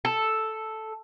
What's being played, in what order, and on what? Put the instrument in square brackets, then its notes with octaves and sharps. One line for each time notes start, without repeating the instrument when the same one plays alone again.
[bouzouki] A4